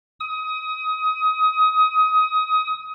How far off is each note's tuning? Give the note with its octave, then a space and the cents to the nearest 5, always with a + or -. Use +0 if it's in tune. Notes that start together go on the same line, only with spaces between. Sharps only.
D#6 +25